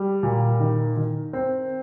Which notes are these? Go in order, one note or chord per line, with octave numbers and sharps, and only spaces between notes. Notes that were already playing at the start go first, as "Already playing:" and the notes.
Already playing: G3
A#2
D#3
D#3
C4